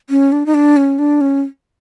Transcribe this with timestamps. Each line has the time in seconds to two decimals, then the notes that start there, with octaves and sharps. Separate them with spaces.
0.10 C#4
0.32 D4
0.46 D#4
0.54 D4
0.76 C#4
0.99 D4
1.21 C#4